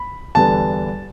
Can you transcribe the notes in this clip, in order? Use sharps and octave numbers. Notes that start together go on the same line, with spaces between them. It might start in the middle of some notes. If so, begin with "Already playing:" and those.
Already playing: B5
E2 D3 G3 B3 A5